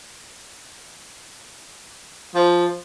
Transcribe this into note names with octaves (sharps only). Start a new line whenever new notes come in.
F3